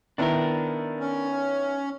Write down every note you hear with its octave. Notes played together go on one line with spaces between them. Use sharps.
D#3 B3 D4 E4 A#4
C#4